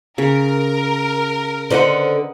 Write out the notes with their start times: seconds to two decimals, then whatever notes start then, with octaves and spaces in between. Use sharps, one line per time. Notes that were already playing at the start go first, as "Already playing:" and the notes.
0.18 C#3 A#4
1.70 D3 B4 C5 D#5 F#5